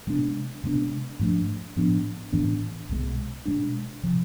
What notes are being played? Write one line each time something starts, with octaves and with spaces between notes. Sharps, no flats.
C3 G#3 B3 D4
C3 G#3 B3 D4
G#2 F3 A3 D4
A2 F3 B3 D4
A2 E3 B3 D4
C2 B2 G#3
B2 G#3 D4
C3 F3